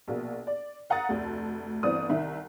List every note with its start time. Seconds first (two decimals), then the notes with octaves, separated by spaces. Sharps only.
0.08 A#1 B2 A#3
0.47 D5
0.90 F5 F#5 A#5 D#6 A6
1.09 F1 D2 A3
1.83 G1 E3 C4 D5 D#6
2.09 C2 D#3 E5